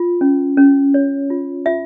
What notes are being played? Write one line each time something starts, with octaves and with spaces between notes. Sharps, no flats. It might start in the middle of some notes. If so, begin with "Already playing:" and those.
Already playing: F4
C#4
C#4
C#5
F4
F4 E5